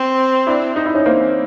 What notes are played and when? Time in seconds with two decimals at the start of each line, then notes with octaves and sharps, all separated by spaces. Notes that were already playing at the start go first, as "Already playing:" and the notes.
Already playing: C4
0.46 D4 E4
0.76 D#4
0.86 E4
0.95 C#4 D#4
1.06 A#3 C4